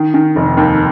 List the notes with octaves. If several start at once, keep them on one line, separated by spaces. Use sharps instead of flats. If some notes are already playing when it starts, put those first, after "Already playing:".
Already playing: D#3
D#3
F1
D#2